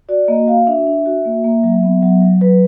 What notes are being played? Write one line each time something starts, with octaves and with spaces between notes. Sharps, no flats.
F#4 D5
A#3 D#5
F#4 F5
D4 E5
D4
F#4
A#3
A#3
F#3
B3
F#3
F#3
F#3 B4